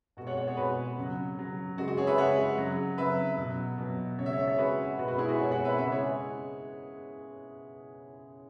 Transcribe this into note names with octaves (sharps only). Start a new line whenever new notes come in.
B2 G#3 F#4
C#5 F#5
C#5 F#5
G#4 C#5
B2 G#3 F#4 B4
C#3 F#3
C#3 F#3
C#3 G#3 F#4
F#4
G#4 C#5
B4 E5
C#3 G#3 C#5 F#5
C#3 F#3
C#3 F#3 B4 E5
B2 F#3
B2 F#3
C#3 G#3 C#5 E5
C#5
E5
G#4 C#5
C#3 G#3 F#4 B4
B2 G#3 F#4 B4
F#4 B4
E4 G#4
F#4 B4
B2 G#3 G#4 C#5
C#5 F#5
B4 E5
C#3 G#3 B4 E5
G#4 C#5